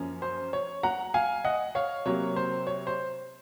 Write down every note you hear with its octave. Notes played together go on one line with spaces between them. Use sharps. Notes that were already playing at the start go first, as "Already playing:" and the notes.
Already playing: F#2 F3 A#3 C#4
C5
C#5
F#5 A#5
F5 G#5
D#5 F#5
C#5 F5
C3 F#3 A#3 C#5
C5
C#5
C5